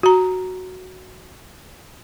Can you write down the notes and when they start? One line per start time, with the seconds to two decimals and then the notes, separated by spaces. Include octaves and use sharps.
0.03 F#4 A#5